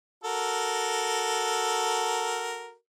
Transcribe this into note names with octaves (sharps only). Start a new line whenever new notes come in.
F#4 A4 A#4